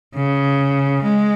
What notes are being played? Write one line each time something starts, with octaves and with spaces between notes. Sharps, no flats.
C#3
G#3